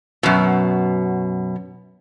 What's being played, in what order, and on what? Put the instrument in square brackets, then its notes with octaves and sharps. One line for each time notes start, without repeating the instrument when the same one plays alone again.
[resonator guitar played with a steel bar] F#2 B2